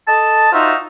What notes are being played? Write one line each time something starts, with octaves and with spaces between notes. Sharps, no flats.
A4 D#5 A5
D#4 F4 F#4 C5 E5